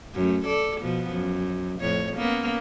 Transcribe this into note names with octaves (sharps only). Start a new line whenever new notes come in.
F#2 A3
A4 D5
B2 F3 B3
F#2
F2 A2 C#5
A#3 B3 C#4